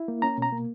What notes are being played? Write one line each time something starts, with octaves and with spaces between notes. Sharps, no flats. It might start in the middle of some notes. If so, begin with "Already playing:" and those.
Already playing: E4
A#3
C#4 A#5
B2 A#5
A#3